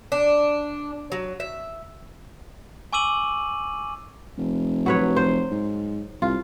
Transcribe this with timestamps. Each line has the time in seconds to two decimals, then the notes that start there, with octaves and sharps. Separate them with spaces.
0.12 D4
1.12 F#3
1.40 E5
2.93 G#5 C#6 D6 E6 D#7 F#7
4.38 F1
4.86 F#3 B4 C#5
5.16 C5
5.51 G#2
6.22 C2 F4